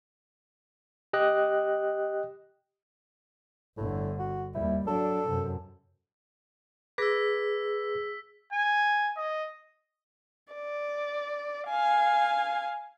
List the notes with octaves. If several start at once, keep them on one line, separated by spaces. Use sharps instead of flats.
G4 D#5 G5 F#6
G1 A2 D3
F#4
D#2 G3 E4
F#3 D4 A4
F#2 C3
G#4 B4 D6 E6 A#6 B6
G#5
D#5
D5
F5 G#5